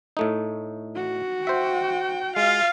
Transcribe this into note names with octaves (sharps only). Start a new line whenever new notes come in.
A2 A3 D#4
F#4
C5 E5 G5
G#3 F4 F5